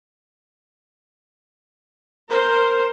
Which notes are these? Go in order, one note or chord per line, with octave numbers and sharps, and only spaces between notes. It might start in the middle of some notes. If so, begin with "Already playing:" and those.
A#4 C5